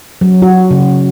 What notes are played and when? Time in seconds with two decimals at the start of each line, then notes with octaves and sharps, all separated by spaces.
0.21 F#3
0.42 F#4
0.71 C#3